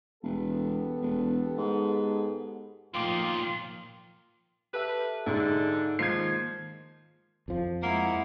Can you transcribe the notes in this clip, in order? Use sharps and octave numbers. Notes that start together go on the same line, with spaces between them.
E1 B3 G4 A4
E1
G#2
B1 A#2 D#3 F3 F4 G5 D6
G4 A4 B4 E5
G#2 D3
D#3 F3 G#3 A#3 G#6 C7
F2 F3
G#3 A#3 E4 F#5